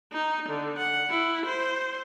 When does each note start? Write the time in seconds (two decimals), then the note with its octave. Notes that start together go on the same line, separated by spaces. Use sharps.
0.12 D#4
0.49 D3
0.78 F#5
1.10 E4
1.46 C5